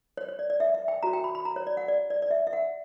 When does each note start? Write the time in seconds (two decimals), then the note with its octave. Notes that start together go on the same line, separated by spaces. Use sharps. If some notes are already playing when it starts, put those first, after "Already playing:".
0.17 C#5
0.28 C#5
0.39 D5
0.50 D5
0.60 E5
0.74 E5
0.88 G5
1.03 F#4 C#5 A#5
1.13 G5
1.24 B5
1.35 B5
1.45 A#5
1.56 C#5
1.67 D5
1.77 F#5
1.88 D5
2.10 D5
2.22 D5
2.31 E5
2.47 E5
2.53 F#5